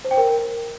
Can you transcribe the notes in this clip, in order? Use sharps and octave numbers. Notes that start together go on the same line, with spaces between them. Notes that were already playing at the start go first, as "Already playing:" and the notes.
C5
G5
A#4